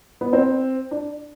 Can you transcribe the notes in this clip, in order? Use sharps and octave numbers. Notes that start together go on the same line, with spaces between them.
B3
C4
D4